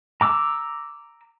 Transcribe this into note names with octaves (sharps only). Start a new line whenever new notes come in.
A#5 D6 E6